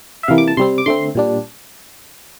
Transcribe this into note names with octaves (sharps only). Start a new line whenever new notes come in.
E5
C3 E3 A#3 F5
D6
A5
C3 G3 C4 C6
D6
D3 A3 C4 C6
A#2 G3 D4